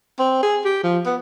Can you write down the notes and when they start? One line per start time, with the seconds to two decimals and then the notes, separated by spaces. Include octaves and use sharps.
0.19 C4
0.43 G#4
0.65 G4
0.84 F3
1.06 B3